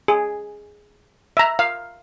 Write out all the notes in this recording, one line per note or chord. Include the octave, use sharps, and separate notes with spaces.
G#4
E5 A#5
F5